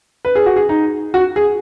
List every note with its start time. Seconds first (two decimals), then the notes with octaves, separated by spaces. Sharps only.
0.25 B4
0.35 G#4
0.46 F#4
0.56 G#4
0.69 D#4
1.14 F#4
1.36 G#4